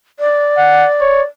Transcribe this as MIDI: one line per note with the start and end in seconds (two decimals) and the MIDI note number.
0.20 1.25 74
0.58 0.88 78
1.01 1.22 73